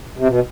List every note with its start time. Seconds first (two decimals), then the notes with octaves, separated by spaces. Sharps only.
0.18 C3
0.28 B2